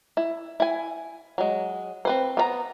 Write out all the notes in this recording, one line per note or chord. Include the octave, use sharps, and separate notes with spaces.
E4
E4 G#5
F#3 G#3
C4 B4 C5
B3 B4 A#5